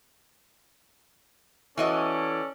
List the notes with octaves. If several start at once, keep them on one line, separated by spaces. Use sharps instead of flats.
E3 C#4 F#4 A4 D5 D#5